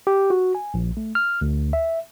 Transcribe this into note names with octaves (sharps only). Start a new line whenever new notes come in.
G4
F#4
G#5
A#1
A3
F6
D2
E5